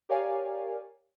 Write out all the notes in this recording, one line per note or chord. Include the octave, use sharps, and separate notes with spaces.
G4 A#4 C#5 D5 F5 G#5